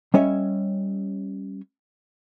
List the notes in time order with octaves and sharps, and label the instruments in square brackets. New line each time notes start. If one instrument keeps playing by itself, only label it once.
[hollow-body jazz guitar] G3 C#4 C#5 D#5 E5